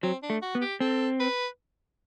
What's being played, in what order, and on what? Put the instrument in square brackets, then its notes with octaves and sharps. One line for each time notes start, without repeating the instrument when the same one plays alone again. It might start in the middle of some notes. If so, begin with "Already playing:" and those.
[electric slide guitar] F#3 [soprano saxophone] C4
[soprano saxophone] D4
[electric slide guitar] A3
[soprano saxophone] F#4
[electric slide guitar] B3
[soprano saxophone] G4
[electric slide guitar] C4 [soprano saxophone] A4
[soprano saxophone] B4